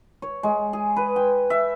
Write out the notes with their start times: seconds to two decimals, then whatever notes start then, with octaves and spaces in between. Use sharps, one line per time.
0.22 C#5
0.43 G#3
0.73 G#4
0.96 B4
1.16 G5
1.50 E5